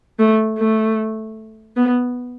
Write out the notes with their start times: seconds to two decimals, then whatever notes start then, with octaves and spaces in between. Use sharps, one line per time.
0.19 A3
0.58 A3
1.76 B3